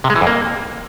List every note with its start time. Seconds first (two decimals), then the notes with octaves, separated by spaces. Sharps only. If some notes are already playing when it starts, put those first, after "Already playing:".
0.04 C3
0.10 G#3
0.16 E3
0.21 F2
0.27 A#3